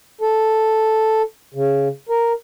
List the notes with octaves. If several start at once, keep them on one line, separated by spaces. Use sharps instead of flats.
A4
C#3
A#4